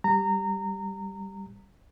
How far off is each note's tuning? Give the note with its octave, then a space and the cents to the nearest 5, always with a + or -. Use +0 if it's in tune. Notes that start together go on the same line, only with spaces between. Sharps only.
G3 +0 A#5 -20